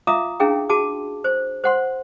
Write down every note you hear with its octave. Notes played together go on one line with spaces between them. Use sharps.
F4 E5 F5 A#5 D6 D#6
C#4 D4 E4 G#4 F5 G5
F#4 G#4 A5 D6
C5
C5 F#5 C6